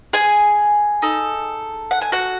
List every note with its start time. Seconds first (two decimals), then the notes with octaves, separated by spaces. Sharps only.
0.13 G#4 G#5
1.02 D#4 A4
1.91 F#5
2.01 G#5
2.12 F#4 F#5